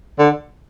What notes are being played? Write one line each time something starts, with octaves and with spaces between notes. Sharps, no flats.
D3